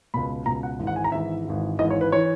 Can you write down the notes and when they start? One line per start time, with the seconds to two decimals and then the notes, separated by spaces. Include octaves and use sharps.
0.14 C#2 B2 B5
0.46 C#2 B2 A#5
0.63 F#5
0.79 G#1 G#2 E3
0.87 F#5
0.96 G#5
1.04 A#5
1.12 G#1 G#2 E3 E5
1.45 G#1 G#2 E3
1.79 G#1 G#2 E3 D#5
1.90 C#5
2.01 B4
2.12 E3 C#5